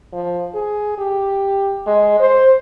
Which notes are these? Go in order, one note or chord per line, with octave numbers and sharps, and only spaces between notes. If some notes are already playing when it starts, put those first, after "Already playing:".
F3
G#4
G4
G#3
C5